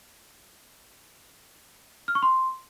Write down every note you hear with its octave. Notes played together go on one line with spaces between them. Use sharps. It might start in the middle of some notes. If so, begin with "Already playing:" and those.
F6
C#6
C6